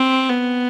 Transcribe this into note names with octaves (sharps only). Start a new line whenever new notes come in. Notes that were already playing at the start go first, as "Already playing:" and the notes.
Already playing: C4
B3